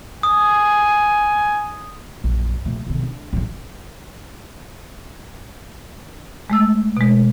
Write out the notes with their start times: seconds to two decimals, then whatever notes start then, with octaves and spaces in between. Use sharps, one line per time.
0.23 G#5 D#6
2.24 A#1 F#2
2.65 A#1 A3
2.87 B1 D3
3.03 D4
3.33 A1 G3
6.50 G#3 A3 E6
6.97 B2 G#3